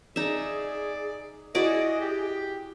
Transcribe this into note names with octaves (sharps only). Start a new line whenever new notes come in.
D#4 G#4 D5 E5
E4 F#4 G#4 D5 D#5
G4